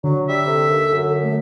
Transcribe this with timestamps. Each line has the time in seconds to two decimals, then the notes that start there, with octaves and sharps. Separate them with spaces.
0.04 D3 F#3
0.29 G3 E5
0.46 C3 A4
0.69 D#2
0.91 F#2
1.23 A3